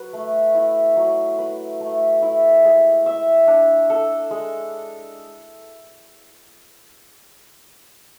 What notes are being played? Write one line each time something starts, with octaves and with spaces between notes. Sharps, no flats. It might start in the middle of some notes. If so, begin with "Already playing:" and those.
Already playing: F#3 B4
A3
E4
F#3
B4
A3
E4
G#3
E5
D4
A4
G#3